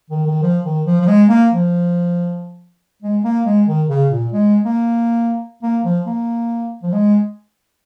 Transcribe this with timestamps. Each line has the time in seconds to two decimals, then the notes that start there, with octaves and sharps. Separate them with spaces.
0.10 D#3
0.27 D#3
0.43 F3
0.64 D#3
0.86 F3
1.01 F3
1.07 G#3
1.29 A#3
1.51 F3
3.02 G#3
3.24 A#3
3.46 G#3
3.68 D#3
3.89 C#3
4.11 A#2
4.32 G#3
4.65 A#3
5.63 A#3
5.84 F3
6.06 A#3
6.83 F3
6.92 G#3